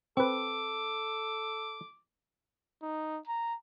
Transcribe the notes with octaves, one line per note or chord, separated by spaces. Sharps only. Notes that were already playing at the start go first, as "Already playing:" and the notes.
C4 A4 B4 D6
D#4
A#5